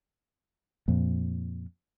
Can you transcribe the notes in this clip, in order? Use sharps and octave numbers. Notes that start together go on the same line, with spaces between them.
F2 A#2